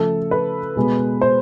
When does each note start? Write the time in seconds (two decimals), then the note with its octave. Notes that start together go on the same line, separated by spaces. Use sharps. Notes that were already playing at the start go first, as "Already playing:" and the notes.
Already playing: C#3 F3 A3 A4
0.31 B4
0.76 B2 G#3 B3
1.21 C5